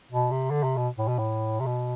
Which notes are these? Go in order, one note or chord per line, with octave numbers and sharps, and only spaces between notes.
B2
C3
D3
C3
B2
A2
B2
A2
C3
B2